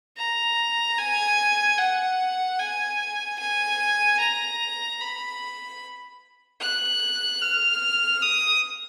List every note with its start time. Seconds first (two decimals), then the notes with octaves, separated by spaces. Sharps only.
0.17 A#5
0.98 G#5
1.78 F#5
2.59 G#5
3.39 G#5
4.19 A#5
5.00 B5
6.61 F#6
7.42 F6
8.22 D#6